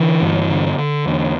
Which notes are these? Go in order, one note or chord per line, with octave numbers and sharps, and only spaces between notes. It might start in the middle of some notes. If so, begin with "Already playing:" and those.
Already playing: D3 E3
G2
D3
D3
E2